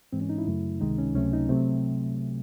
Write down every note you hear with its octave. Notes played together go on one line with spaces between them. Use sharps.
G#2 E3 G#3 C4
C#4
D#4
E4
F#2 C#3 F#3 A3
C#2 C3 D#3 G#3 D#4
C#4
C#2 C3 F#3 A3 C#4
D#4
C3 F#3 A3 C4